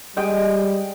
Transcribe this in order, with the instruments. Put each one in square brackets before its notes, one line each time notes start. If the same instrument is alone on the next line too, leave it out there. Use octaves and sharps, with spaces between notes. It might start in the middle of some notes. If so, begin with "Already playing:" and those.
[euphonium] G3 [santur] G#3 G5 D#6